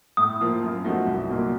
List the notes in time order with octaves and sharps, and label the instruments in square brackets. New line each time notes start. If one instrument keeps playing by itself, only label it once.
[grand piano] A2 [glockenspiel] D#6
[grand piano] F3 A#3 F4
F#2
F3 A3 D#4 F#4
C2
A#2 F#3 A#3 D#4